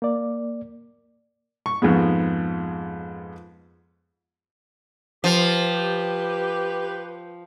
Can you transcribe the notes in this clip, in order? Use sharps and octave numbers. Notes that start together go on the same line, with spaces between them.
A#3 D5
C#6
F2 G#2 G#3 B3
F3 G4 B4